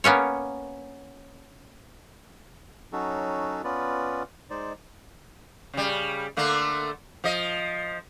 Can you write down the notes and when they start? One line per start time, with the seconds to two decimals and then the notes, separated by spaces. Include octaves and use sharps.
0.04 A#3 B3 C#4 C#5
2.93 F#3 C#4 D#4 F#4 A4
3.64 B3 C#4 F4 B4 D5
4.50 G#3 D#4 C5 D5
5.74 C#3 G3
6.37 D3 A3 A#3
7.24 F3 D#5